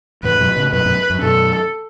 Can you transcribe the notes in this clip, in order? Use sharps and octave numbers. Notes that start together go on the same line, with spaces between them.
E2 A2 B4
F#2 B2
A2 C#3
F#2 B2 B4
F#2 B2
F#2
F#2 B2 A4